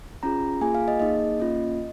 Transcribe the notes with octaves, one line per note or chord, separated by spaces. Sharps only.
C#4 F4 G#4 A#5
A#3 F4 G#4 G#5
F5
D#5
A#3 D#4 G#4 D#5
A#3 C#4 F4